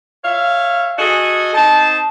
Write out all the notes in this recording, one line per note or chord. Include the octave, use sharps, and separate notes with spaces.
C#5 E5 F5
F#4 G#4 A4 D#5 G#5
C4 D#4 A5